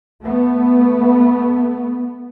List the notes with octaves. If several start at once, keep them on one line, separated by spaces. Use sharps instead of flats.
A3 B3